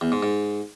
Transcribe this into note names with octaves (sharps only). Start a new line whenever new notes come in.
E2
G#2
G#2